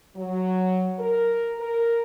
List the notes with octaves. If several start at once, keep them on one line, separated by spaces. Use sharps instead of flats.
F#3
A#4
A#4